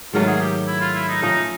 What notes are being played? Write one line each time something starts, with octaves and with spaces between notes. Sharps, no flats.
G#2 D#3 F#3 A3 F4
G#4
G4
E4
F4
E4
D#4
F3 A3 C#4 D#4